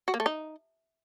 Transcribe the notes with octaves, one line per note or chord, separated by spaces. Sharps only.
F#4
A#3
A3
D#4